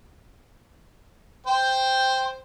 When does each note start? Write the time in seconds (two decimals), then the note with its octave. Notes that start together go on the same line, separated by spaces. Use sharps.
1.46 C5 G5